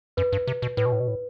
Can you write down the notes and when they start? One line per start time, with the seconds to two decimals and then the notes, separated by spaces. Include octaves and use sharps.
0.17 F#2 B4
0.32 G2
0.47 C3
0.62 B2
0.77 A2 B4
0.86 B2
0.92 A2
1.00 B2
1.08 A2